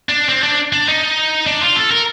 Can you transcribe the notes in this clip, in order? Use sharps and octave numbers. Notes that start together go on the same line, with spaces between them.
D4
C4
D4
D4
D#4
D4
F4
A4
A#4